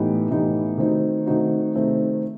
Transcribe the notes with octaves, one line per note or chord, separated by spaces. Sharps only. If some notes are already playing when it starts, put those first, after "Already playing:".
Already playing: A2 E3 B3 D#4 G4
A2 E3 B3 D#4 G4
D#3 A3 C4 D#4 F#4
D#3 A3 C4 D#4 F#4
C3 D#3 A3 C4 D#4